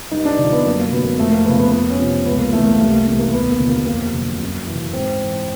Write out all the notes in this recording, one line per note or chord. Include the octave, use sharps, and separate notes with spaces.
G2 D#4
D4
D3 F3
B3
F#2 A#3
A#3
D3 F#3 B3
A#3
F2 A3
A#3
C#3 F3 B3
B3
F2 B3
C#4
C3 F3
C#2 B3
A#3
C#3 E3 A3
A#3
C2 A3
A#3
C3 E3 A3
A#3
D#2 B3
A#3
D3 F3
A#3
F2 A#3
D3 F#3
F#2
C#3 E3
G#2 C4
E3